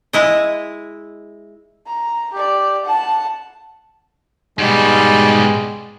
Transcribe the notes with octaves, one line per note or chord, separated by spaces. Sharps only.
G#3 E4 D#5
A#5
G4 D5
F#5 A5
G#2 B2 G3 G#3